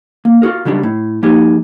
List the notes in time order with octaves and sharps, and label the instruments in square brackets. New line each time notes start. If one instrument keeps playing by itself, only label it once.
[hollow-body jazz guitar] A#3
F4 F#4 G#4 A#4
C#3 F#3 G3 D4
A2
F3 A#3 D#4 G4 G#4